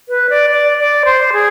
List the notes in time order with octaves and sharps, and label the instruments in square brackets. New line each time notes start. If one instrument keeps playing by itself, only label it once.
[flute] B4
D5
D5
D5
C5
G#4